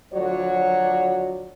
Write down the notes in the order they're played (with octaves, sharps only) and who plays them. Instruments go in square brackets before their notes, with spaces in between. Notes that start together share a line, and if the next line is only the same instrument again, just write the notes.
[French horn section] D2 F3 F#3 F#4 C#5 D5